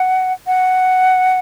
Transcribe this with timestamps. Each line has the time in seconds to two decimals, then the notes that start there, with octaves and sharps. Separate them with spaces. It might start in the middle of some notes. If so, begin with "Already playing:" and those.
Already playing: F#5
0.47 F#5